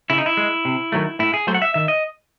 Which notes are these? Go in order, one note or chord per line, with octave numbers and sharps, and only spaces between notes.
C#3 E4
D#4
E4
G#3
C3
D#3 F#3 A3
A2 E4
G#4
F#3 A3 C5
F#5
E5
D#3 E5
D#5